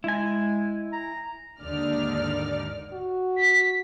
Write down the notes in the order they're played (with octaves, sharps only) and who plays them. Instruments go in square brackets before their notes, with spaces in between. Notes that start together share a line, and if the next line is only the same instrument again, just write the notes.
[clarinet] G#3 [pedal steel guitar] E4 G#5
[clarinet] A#5
[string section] D#2 G#2 D3 D#4 D5 F6
[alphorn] F#4
[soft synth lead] B6